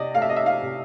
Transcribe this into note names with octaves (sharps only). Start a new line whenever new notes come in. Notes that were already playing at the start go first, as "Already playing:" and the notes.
Already playing: C3 D5 D#5
A3 F5
E5
D#5
E5
F5
C3